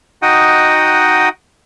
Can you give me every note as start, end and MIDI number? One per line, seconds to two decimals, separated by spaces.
0.22 1.29 63
0.22 1.29 66
0.22 1.29 75
0.22 1.29 78
0.22 1.29 79
0.22 1.29 87